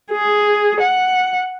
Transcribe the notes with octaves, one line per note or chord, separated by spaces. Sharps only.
G#4
F#5